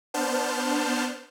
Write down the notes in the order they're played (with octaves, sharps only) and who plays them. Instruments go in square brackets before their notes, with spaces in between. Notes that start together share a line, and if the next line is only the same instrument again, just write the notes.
[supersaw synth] B3 D4 C5 A5 F6 G6